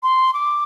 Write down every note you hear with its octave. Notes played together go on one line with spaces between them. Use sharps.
C6
D6